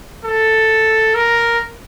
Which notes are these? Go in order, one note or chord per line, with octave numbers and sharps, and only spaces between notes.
A4
A#4